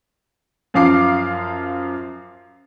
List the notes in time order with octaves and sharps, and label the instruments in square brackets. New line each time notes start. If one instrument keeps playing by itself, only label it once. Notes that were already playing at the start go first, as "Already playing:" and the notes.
[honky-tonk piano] F#2 F3 F5 D6 C7